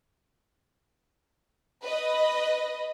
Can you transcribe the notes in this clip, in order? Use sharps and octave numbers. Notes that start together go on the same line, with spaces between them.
B4 D#5